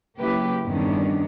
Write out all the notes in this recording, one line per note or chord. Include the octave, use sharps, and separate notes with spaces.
C#3 F#3 A#3 E4 G4 B4
E2 G2 D#3 C#4 D4